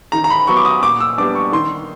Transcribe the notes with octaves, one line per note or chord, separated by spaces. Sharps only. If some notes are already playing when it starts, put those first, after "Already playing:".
D#3 A#5
A#5
B5
F#3 B3 C#6
D6
D#6
A#2 D6
E6
G3 B3 D4 D6
C#6
D#3 C6